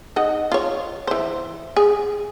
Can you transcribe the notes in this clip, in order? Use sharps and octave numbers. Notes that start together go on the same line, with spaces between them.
D#4 D#5 F#5
F4 C#5
E3 C5
G#4